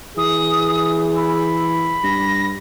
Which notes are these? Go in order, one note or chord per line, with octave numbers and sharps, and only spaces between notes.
E3 G#4 D#6
B5 E6
G2 A#6